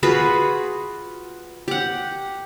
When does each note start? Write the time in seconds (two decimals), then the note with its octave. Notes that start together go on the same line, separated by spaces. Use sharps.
0.03 F4 F#4 G#4 B4
1.68 G4 F#5